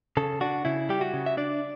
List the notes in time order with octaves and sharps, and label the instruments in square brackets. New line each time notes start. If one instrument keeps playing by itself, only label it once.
[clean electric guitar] C#3 A4
D4 F#4
C#3 E4
G3 G4
F#4
C#3
E5
D4 D5